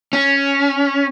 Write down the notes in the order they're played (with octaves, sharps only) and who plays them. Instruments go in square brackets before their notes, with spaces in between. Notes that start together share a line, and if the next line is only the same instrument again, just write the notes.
[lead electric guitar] C#4